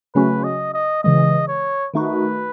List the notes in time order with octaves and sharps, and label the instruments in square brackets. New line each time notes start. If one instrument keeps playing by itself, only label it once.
[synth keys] C#3 F#3 A3 C#4 F#4 [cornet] B4
[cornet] D#5
D#5
[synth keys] C#3 E3 G#3 [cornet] D#5
[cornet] C#5
[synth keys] D#3 A3 D#4 F#4 [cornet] B4